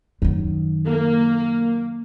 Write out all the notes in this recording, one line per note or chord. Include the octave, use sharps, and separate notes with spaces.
F#2 D#3
A#3